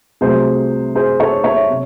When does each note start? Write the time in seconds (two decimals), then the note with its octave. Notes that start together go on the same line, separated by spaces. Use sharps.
0.21 C2 C3 F#3 A3 G#4 C5
0.95 G#4 C5
1.20 A4 C#5
1.44 C#5 E5
1.70 C3